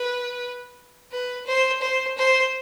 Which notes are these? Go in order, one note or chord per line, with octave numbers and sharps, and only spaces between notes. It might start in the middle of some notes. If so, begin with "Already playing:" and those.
Already playing: B4
B4
C5
C5
C5